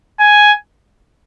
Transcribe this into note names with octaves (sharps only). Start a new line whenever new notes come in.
G#5